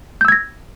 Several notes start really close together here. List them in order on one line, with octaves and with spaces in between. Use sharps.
G6 E6 G#6 A#6